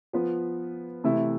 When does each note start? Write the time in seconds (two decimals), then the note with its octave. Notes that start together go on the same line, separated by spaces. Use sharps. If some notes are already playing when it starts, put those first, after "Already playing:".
0.13 F3 B3 F4 B4
1.04 C3 E3 A3 E4